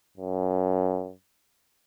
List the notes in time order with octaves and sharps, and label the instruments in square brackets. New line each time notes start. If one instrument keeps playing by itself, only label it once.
[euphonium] F#2